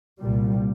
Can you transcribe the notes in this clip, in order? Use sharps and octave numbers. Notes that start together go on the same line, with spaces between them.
C2 A#2 G3